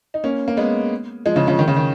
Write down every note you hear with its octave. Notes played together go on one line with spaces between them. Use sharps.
D#4
A#3 C#4
A#3
G#3 B3
F3 G#3
C#3 F3
C#3 F3
D#3
C#3
D#3